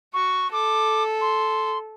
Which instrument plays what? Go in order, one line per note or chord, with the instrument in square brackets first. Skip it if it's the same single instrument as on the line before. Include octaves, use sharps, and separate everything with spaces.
[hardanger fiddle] F#4 [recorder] C#6
[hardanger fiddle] A4 [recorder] D6
[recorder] C6